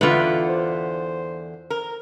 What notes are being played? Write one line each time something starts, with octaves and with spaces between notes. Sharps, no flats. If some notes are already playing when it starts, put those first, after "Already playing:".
E2 D3 F4 B4 F#5
C5
A#4